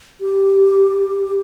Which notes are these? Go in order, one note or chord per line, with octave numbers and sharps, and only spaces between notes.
G4